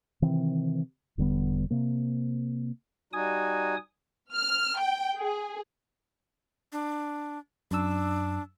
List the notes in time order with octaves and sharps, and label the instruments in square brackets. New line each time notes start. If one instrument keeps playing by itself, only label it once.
[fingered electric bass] C3 D#3 E3 C4
E1 D3 G3 B3
C3 A#3
[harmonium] G3 D#4 F#4 [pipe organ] G#5 D#6
[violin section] F6
G5
G#4
[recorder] D4
[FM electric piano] F#2 E6 [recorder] D4